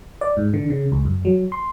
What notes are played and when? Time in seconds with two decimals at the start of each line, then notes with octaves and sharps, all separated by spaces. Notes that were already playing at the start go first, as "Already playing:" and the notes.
0.21 D5
0.37 G#2
0.54 D3
0.70 C#3
0.92 C#2
1.05 F#2
1.25 F#3
1.52 C6